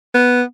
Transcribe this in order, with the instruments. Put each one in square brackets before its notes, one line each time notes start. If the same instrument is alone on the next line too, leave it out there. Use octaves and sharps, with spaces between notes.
[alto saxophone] B3